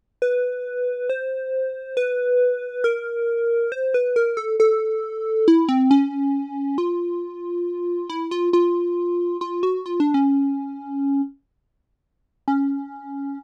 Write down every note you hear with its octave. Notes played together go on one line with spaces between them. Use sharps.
B4
C5
B4
A#4
C5
B4
A#4
A4
A4
E4
C4
C#4
F4
E4
F4
F4
F4
F#4
F4
D4
C#4
C#4